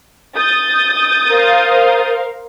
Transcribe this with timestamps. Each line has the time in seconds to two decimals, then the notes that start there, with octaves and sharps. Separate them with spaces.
0.36 D#6 G6 A6
1.29 A#4 C5 F5